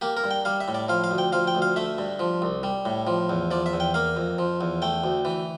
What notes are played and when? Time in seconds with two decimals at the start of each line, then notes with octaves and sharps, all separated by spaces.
0.01 A#3 G4
0.17 A#4
0.24 G2
0.31 G5
0.45 G3 F5
0.60 E5
0.68 A2
0.75 D5
0.89 F3 F5
1.04 F5
1.11 D2
1.18 G5
1.32 F3 F5
1.47 G5
1.55 D2
1.62 F5
1.76 A3 E5
1.98 G2
2.19 F3
2.42 C2
2.63 G3
2.85 A2
3.07 F3
3.29 E2
3.51 F3 D5
3.66 E5
3.73 E2
3.80 G5
3.94 A#3 F5
4.17 F2
4.39 F3
4.61 E2
4.82 A3 G5
5.04 D2
5.25 E3